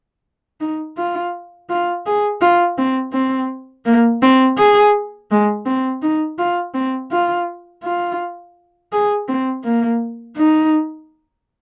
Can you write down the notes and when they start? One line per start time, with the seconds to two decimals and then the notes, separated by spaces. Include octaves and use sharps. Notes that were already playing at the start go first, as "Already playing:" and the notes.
0.60 D#4
0.97 F4
1.69 F4
2.06 G#4
2.41 F4
2.78 C4
3.13 C4
3.85 A#3
4.22 C4
4.58 G#4
5.31 G#3
5.66 C4
6.02 D#4
6.38 F4
6.74 C4
7.12 F4
7.83 F4
8.92 G#4
9.28 C4
9.64 A#3
10.36 D#4